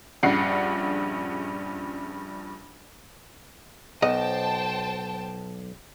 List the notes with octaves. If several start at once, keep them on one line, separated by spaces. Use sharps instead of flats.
A#1 G2 C#3 D4 F#5 C7
B1 C5 D#5 G5 A5